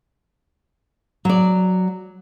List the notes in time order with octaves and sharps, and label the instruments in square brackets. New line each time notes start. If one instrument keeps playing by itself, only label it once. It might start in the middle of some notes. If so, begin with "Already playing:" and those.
[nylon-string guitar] F#3 D5